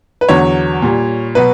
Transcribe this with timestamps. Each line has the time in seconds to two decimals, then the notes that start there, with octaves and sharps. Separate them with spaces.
0.21 B4
0.29 E2 D3 F#3 C#5
0.82 A#2 G3
1.35 B2 F#3 B4